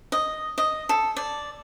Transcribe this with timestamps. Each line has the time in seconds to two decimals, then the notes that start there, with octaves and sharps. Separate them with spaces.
0.12 D#5
0.58 D#5
0.89 A4
1.16 D5